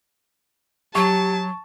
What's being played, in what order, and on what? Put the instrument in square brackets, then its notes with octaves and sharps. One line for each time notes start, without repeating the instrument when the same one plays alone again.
[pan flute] F#3 [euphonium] G4 [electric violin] A5 [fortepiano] C#6